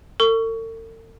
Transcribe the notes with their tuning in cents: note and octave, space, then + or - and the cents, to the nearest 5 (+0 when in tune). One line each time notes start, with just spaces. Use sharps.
A4 +45 C#6 +20